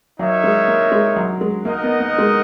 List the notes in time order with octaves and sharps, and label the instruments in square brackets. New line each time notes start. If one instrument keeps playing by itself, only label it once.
[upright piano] F#3 [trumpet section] D#4 A#4 C#5 E5
[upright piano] G#3
A#3
G#3
F#3
G#3
[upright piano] A#3 [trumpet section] D#4 A#4 D#5 F#5
[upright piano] B3
A#3
G#3